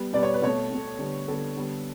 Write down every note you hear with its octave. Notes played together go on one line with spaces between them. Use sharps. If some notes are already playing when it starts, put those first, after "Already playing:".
Already playing: G3 B3
B2 G3 B3 D5
C#5
B4
B2 A3 C#5
B2 A3
D3 G3 B3
D3 G3 B3 A4
D3 G3 B3